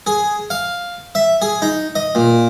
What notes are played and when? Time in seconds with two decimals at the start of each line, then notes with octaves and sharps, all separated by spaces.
0.07 G#4
0.50 F5
1.15 E5
1.42 G#4
1.62 D#4
1.95 D#5
2.15 A#2